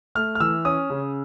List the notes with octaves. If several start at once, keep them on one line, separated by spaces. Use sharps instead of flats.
A3 F6
F6
E3 E6
C#4 D#6
C#3